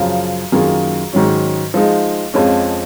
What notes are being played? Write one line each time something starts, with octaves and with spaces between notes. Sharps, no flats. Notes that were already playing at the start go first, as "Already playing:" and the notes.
Already playing: F#2 C#3 F3
F#2 D#3 A#3 F4 G#4
G#2 D#3 F#3 C#4
F3 G#3 D#4
F2 F3 G#3 C#4